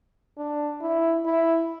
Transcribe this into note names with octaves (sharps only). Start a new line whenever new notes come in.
D4
E4
E4